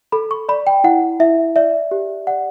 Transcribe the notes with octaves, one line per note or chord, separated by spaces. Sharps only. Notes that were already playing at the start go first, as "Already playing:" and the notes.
A4 B5
C#6
D5 B5
G5
E4 F#5
E4 E5
D5 E5
G4
D5 F#5